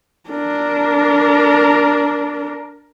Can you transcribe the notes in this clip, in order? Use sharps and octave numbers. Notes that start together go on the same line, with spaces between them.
D4 A#4